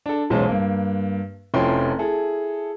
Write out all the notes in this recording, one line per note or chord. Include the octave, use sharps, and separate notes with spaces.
D4 A4
E1 B1 G#3 C#4 C5 A5
G2 A#3
F1 F3 C#4 E4 G5 C6
E4 G#4 A4